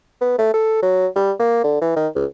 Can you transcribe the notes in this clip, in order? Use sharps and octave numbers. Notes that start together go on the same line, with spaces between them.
B3
A3
A4
F#3
G3
A#3
D3
E3
D#3
C#2